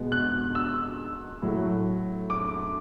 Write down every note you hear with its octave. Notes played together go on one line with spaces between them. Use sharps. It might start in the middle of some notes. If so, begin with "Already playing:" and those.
Already playing: B2 G#3 B3
F#6
E6
A2 F#3 A3
D6